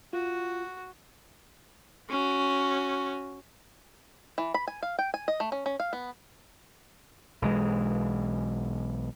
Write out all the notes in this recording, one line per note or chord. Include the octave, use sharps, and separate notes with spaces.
F4 F#4
C#4 F#4
E3
B5
G#5
F5
G5
G#5
D#5
A3
C#4
C#4
F5
B3
B1 E3 G#3